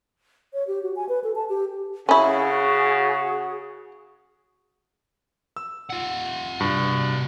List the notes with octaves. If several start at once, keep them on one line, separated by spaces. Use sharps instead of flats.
C#5
G4
F#4
G#5
B4
A4
A5
G4
C#3 C#4 E4 F#4 G#4
E6
F4 F#5
G2 C3 F#4